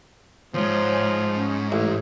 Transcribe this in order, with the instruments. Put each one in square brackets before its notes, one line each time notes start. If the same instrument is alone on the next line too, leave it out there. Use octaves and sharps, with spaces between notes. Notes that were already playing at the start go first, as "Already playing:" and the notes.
[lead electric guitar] D#2 G#2 [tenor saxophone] F3 [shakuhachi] C#5
[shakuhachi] C#4
[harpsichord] A1 [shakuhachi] C#5